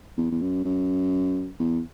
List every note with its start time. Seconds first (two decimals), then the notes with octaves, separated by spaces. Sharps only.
0.17 E2
0.31 E2
0.41 F#2
0.64 F#2
1.59 E2